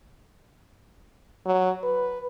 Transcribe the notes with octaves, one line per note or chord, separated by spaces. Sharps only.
F#3
B4